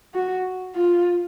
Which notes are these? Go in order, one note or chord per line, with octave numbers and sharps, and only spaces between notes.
F#4
F4